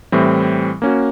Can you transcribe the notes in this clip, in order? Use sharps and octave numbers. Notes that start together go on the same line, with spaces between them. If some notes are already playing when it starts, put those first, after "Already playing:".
A2 E3 G3 C4
A#3 C#4 F#4